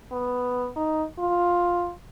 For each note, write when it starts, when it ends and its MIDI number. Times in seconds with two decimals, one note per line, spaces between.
0.12 0.68 59
0.76 1.04 63
1.19 1.92 65